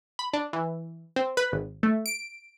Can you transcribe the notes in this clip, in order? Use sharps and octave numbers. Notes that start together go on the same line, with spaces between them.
B5
D4
E3
C4
B4
G#1
A3
D7